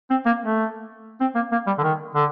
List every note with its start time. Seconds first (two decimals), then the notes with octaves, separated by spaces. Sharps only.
0.10 C4
0.26 A#3
0.42 A3
1.20 C4
1.35 A#3
1.52 A#3
1.67 G3
1.78 D3
1.83 D#3
2.15 D3